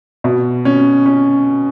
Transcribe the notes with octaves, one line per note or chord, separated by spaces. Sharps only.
B2
C#4
C#4